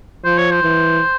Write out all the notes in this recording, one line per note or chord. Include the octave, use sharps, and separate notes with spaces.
F3 C5
C#5
C5
E3